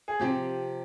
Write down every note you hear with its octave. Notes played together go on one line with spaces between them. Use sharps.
G#4
C3 F3 C4 G4